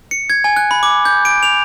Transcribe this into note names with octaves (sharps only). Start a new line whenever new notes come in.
C#7
G#6
G#5
F#6
B5
D6
G6
D7
F7